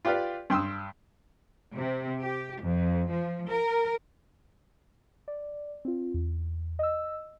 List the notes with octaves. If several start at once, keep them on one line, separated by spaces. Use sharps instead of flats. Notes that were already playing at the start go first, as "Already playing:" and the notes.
F4 G4 B4 D5 F5
G2 G5 C6 D#6 E6
C3
G4
F2
F3
A#4
D5
C4 F4
E2
D#5 E6